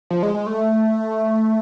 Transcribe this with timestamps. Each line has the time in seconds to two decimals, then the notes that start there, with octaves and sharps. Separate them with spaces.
0.10 F3
0.23 G#3
0.34 G#3
0.46 A3